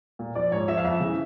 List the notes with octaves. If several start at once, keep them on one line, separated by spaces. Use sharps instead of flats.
A#2
F3 D5
G#2 C#5
F3 E5
F5
F2 E5
C#3 E3